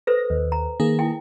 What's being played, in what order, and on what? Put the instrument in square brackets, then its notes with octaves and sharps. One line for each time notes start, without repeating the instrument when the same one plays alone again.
[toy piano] A4 B4 C5 [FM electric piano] A#6
[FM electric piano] D#2
[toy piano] A#5
[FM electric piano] D#3 A#3 G#4
[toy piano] E4 G5